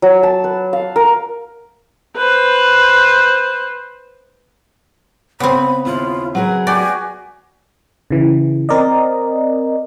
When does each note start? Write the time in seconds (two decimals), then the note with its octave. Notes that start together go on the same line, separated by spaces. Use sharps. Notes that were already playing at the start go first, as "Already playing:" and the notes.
0.02 F#3
0.23 A5
0.44 B4
0.73 F5
0.96 A#4
2.17 B4 C5
5.40 C#3 B3 C4 B5
5.85 D#2 E4 F4
6.35 F#3 G#4 A#4 B4
6.67 F#4 G4 D5 G#5
8.11 C#3 E3
8.69 C4 A#4 D5 D#5